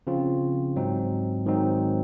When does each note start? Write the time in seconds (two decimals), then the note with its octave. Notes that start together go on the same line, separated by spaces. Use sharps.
0.07 C#3 F3 C4 F4
0.76 G#2 F#3 C4 D#4
1.46 G#2 D#3 F#3 C4 D#4